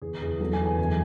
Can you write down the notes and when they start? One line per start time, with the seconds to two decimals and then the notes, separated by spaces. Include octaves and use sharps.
0.02 E2 G#4
0.21 E2 G#4
0.40 F#3 A4
0.53 G#5
0.59 E2
0.66 G#5
0.79 F#2 G#5